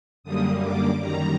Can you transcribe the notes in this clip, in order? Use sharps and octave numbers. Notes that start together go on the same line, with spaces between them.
F#2 D3 G3 A#3 D#6
D6
F#2 D#3 G3 A#5